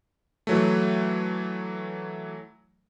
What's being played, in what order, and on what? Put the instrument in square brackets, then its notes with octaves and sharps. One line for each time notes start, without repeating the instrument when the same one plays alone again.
[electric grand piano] E3 F#3 A3